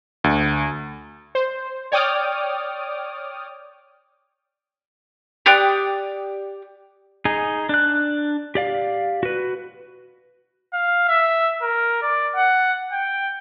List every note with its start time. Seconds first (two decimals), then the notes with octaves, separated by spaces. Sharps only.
0.24 D2
1.35 C5
1.92 C#5 D5 G5 D6 D#6 F6
5.46 G4 D5 D#6 F#6
7.25 D#4 G#4
7.69 D4 F#6
8.55 G4 D5 F5
9.23 F#4 B4
10.73 F5
11.08 E5
11.62 A#4
12.02 D5
12.35 F#5
12.92 G5